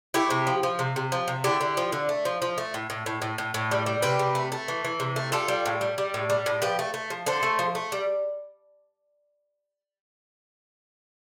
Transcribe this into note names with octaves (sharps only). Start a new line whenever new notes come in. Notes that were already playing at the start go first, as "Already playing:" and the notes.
A3 E4 G4
C3
F3
F3
C3
C3
F3
C3
D3 E4 G4
D3
F3
D3
A3
F3
F3
A3
A2
A2
A2
A2
A2
A2
G3
G3
C3 G4 B4
C3
A3
A3
E3
E3
C3
A3
G3 F4 A4
G3
A2
G3
G3
A2
G3
A2
F3 G4 B4
A3
A3
F3
D3 A4 C5
A3
F3
A3
G3